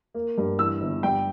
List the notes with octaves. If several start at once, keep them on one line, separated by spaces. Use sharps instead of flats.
A#3
G2
E3 E6
G1
G2 G5